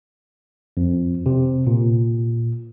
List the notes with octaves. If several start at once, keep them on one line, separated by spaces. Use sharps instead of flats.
F2
C3
A#2